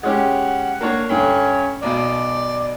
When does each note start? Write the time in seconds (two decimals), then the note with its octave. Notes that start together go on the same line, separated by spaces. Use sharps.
0.03 G#3 C#4 G4 F#5
0.81 A#3 D4 C#5
1.09 G2 D3 C#4
1.82 B1 B2 D5